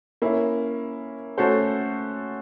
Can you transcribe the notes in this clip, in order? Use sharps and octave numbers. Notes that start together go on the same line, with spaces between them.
A#3 C#4 E4
A3 C#4 F#4 A4 C5